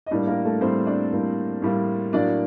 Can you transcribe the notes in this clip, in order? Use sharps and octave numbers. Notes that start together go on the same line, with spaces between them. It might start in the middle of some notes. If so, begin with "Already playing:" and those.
D#5
A2 G3 A#3 D4 D5
A#3 A#4
A3 A4
A2 G3 A#3 C4 C5
D4 D5
A2 G3 A#3
A2 G3 A#3
A2 F#3 A#3 D4 D5